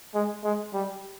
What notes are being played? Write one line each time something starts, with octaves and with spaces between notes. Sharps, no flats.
G#3
G#3
G3